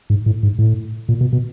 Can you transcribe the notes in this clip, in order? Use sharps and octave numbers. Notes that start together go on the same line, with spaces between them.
G#2
A2
G#2
A2
A#2
B2
B2